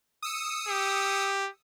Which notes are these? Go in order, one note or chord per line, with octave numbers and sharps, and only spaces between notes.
D#6 E6 C#7
G4